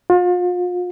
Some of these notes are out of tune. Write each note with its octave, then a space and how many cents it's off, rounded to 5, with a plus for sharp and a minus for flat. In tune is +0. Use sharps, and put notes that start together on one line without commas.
F4 +40